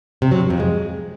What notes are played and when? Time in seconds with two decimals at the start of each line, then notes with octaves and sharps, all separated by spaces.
0.22 C3
0.31 F#3
0.41 G2
0.50 F2
0.60 G#3